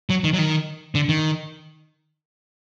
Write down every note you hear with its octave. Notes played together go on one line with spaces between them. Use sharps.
F#3
D#3
F#3
D#3
D3
D#3